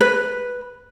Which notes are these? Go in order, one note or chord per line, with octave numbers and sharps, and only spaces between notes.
B4